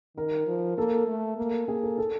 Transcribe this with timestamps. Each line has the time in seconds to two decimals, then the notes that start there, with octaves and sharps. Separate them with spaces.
0.17 D#3 A#4
0.47 F3
0.78 A#3 A4
1.07 A3
1.37 A#3
1.68 A#3 G#4
1.83 A4
1.98 A4